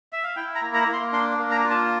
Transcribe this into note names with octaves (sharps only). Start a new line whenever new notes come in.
E5
F5
E4 G5
A#5
A#3
A#5
A#3
C6
D4 C6
A#3
A#5
F4
A5